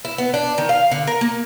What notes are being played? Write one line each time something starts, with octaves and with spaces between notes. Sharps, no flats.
E4
B3
D4
D#3
F5
D3
A#4
A#3